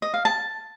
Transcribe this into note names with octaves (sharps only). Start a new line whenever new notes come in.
D#5
F5
A5